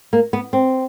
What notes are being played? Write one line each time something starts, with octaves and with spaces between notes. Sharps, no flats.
A#3
B3
C4